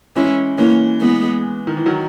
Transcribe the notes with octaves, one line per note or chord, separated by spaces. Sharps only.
E3 G#3 C#4 E4
E3 G#3 A#3 C#4
E3 G#3 B3
D#3
E3
D#3 F#3